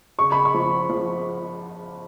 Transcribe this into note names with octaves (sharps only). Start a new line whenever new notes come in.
C#3 C#6
B5
C#6
F3
F3